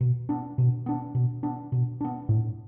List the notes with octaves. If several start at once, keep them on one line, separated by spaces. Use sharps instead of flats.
B2
B3 D4
B2
B3 D4
B2
B3 D4
B2
B3 D4
A2